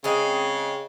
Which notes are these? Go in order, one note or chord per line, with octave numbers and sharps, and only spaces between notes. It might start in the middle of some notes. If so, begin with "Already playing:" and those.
C#3 G#3 C4 G#4